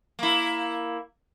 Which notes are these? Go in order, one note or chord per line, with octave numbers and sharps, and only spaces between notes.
A#3 E4